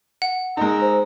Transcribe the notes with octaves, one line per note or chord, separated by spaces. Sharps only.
F#5
G#3 D#4 A#4 A#5 E6
C5